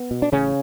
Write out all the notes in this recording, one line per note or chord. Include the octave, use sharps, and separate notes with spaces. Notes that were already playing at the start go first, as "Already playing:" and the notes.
Already playing: B3
B2
D4
A1 C#3 C#4